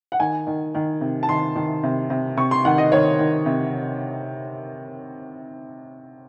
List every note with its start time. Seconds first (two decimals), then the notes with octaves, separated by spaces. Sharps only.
0.12 F#5
0.19 D#3 G#5
0.47 D#3
0.75 D#3
1.01 C3
1.23 A5
1.29 D#3 C6
1.56 D#3
1.83 C3
2.10 C3
2.37 C3 C#6
2.51 C6
2.65 D#3 F#5
2.78 D#5
2.92 D#3 C#5
3.19 D#3
3.46 C3